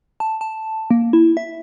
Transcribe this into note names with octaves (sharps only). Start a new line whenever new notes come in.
A5
A5
A#3
E4
E5